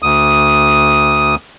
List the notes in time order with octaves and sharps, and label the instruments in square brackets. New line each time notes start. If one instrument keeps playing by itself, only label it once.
[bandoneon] D2 D#6